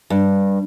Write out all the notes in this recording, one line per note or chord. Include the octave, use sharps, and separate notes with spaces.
G2